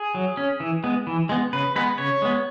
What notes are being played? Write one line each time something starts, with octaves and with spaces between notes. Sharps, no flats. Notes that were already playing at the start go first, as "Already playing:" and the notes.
Already playing: G#4
F#3
C#4
E3
G#3 B3
E3
G#3 B3
C#3 B4
G#3 B3 B4
C#3 C#5
G#3 B3